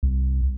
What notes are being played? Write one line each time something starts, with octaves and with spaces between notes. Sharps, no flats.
C2